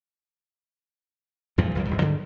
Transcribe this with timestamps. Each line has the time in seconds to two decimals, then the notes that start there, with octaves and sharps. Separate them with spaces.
1.58 E2 G2 A#2 F3
1.75 C#2 F#2 D#3
1.87 A#1 G#2 G3
2.00 G#2 D3 D#3 G3